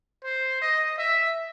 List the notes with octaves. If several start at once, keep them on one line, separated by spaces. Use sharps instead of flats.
C5
D#5
E5